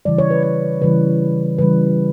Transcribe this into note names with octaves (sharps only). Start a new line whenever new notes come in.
C#3 E3 G3 D5
C#5
B4
C#5
C#3 E3 G3 B4
C#3 E3 G3 B4